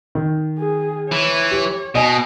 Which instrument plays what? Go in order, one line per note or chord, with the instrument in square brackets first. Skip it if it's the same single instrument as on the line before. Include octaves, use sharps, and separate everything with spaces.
[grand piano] D#3
[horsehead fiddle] G#4
[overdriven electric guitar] E3 [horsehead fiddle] C#5
[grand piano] G4
[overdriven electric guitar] B2 [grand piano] D#5 G#5